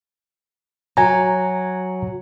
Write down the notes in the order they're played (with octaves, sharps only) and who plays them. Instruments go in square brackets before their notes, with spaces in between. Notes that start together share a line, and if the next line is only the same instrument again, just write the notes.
[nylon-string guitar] F#3 [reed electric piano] G#5 A#5